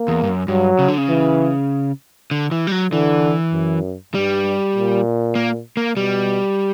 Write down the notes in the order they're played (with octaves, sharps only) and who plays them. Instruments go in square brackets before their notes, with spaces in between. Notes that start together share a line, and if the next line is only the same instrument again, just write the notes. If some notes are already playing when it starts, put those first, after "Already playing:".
Already playing: [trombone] A#3
[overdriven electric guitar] E2
G2
F#2
[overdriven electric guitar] G2 [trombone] F#3
[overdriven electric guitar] C#3
D3
C#3
[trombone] E3
[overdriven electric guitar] D3
E3
G3
F#3
[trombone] D3 [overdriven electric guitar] E3
[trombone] F#2
[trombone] G2 [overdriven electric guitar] G3
[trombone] A#2
[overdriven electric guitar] A#3
A#3
[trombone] B2 [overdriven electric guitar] G3